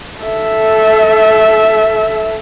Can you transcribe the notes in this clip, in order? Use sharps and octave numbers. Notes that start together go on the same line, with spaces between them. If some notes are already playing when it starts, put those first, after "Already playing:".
A4 E5